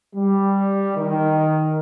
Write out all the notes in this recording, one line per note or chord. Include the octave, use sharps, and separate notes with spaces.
G3
D#3